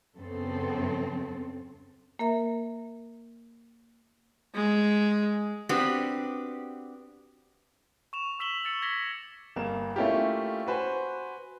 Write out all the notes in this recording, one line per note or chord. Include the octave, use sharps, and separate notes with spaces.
F#2 C#3 B3 C4 A4
A#3 A#4 E5
G#3
B3 C4 D4 F#4 G4
C#6 E7 F7
C#6 E6 B6 E7 F#7 G7
E6 A6 C#7 F7
D6 G#6 A#6 B6 G7
G1 A#3 E7
A3 A#3 C#4 E4 F4 G4
F#4 B4 C5 G#5